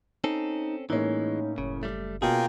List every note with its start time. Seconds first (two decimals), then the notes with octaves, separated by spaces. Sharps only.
0.24 C4 C#4 D#4 A4
0.90 A2 E3 G#3 A#3 C#4 D#4
1.58 F#1 C#3
1.83 G3 A3
2.22 B2 A#3 C#4 F4 G#4 G5